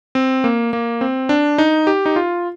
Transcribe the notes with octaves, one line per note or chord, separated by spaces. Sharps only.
C4
A#3
A#3
C4
D4
D#4
G4
D#4
F4